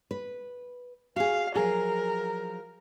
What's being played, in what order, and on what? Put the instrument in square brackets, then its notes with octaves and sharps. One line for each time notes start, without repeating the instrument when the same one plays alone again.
[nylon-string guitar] B4
[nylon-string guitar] F#4 G#4 [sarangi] F5
[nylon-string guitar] F3 F#3 G#4 [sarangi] A#4